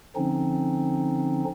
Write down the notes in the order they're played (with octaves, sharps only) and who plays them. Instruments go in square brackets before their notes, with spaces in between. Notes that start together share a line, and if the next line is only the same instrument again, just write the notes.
[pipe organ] D3 F3 C4 C#4 D#4